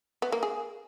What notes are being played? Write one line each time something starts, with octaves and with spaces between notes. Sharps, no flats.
B3
A#3
G#4